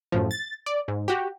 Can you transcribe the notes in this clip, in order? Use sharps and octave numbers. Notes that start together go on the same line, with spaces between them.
F#2 A2 F3
A6
D5
G#2
F#4 G4